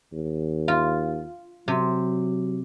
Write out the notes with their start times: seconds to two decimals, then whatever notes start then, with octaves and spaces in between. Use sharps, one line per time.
0.13 D#2
0.68 F4
1.68 C3 F#3